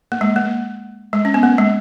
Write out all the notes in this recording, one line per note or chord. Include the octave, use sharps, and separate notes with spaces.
A#3
G#3
A#3
G#3
C#4
B3
A#3
G#3